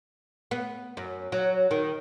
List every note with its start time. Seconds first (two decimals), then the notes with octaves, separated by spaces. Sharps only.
0.51 B3
0.97 F#2
1.32 F#3
1.71 D#3